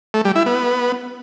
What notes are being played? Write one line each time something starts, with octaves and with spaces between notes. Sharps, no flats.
A3
G3
E4
B3